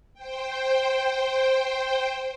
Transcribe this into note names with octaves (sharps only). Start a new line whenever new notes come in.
C5 G5